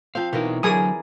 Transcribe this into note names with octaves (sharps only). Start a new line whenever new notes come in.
F3 C4 F5
B2 E3 D#4 F4 A#4
D3 F#3 E4 G#4 A#4 D5 G#5 D#6